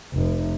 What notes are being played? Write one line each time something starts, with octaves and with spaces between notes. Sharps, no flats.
F1